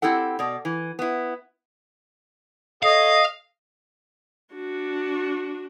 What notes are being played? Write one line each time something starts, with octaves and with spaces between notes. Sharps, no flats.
C4 E4 G4 A4 F#5
B2 D5
E3
B3 E4
A4 C#5 D#5 F5
D4 F#4